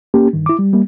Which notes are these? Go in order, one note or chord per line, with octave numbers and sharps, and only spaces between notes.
A#3 C#4 G4
G2 D#3
E4 D6
G3
G3 A#3